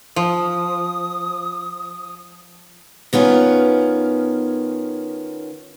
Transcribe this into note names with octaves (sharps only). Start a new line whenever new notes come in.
F3 D#6
D#3 B3 C#4 F4